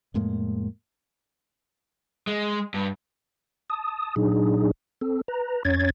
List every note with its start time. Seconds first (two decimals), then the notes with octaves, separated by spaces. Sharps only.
0.14 F2 A2 G#3 A#3
2.27 G#3
2.74 G2
3.70 A5 D#6
4.16 A#2 F#3 D4 D#4 G#4
5.01 C4 A4
5.28 B4 A#5
5.65 F2 C#4 C#5 G#6 A6